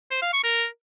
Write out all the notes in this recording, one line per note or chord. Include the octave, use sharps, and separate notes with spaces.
C5
F5
C#6
A#4